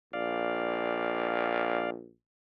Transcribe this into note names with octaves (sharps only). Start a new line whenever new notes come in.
A#1 D5 F5